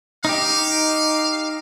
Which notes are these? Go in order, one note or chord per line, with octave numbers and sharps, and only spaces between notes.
D#4 G4 F5